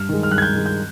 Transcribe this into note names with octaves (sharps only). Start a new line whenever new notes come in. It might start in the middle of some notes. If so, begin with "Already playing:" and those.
Already playing: G2 F6
D#3 G#3
F6
G2 F#6
G#6
G6
D#3 G#3
G6